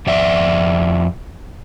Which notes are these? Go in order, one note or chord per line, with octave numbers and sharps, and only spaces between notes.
F2 D5 E5